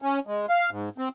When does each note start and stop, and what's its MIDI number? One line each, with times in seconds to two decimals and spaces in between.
0.02 0.19 61
0.27 0.46 56
0.50 0.70 77
0.71 0.89 44
0.98 1.09 60